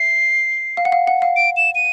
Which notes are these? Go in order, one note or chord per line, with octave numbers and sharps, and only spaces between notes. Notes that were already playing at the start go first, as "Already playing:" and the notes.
Already playing: E5 C7
F5
F#5
F5
F#5
F5
D7
E7
D#7